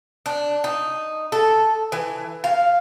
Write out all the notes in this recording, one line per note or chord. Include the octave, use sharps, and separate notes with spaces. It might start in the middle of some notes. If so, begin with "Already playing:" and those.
D4
D#4
A4
E3
F5